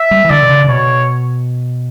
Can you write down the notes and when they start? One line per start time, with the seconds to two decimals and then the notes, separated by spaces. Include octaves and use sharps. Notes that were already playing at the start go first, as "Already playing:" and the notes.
Already playing: E5
0.11 G3
0.25 E3
0.30 D3 D5
0.43 B2
0.49 C#3
0.64 C#3
0.68 B2 C#5